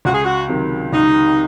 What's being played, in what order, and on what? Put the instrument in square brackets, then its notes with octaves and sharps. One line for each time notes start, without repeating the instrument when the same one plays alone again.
[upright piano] C#2 [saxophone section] F#4
[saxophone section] G#4
F#4
[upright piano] C3 D#3 F#3
[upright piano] C#2 [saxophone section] D#4